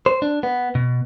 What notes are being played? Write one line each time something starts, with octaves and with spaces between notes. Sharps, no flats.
C5
D4
B3
B2